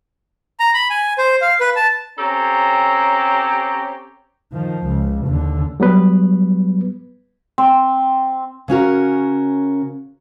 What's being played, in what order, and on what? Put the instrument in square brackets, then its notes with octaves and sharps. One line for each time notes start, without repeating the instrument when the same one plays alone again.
[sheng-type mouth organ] A#5
B5
G#5
C5
F5
B4
A5
[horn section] C4 C#4 G4 A4 C#5 A#5
[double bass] D#3 F3
C#2
D#2 D3
[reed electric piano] F#3 G3 B3 B4
[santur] C4
[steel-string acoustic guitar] C#3 C#4 F#4 A#4